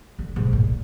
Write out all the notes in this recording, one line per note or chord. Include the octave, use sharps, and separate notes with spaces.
D3
G#2 B2
A#2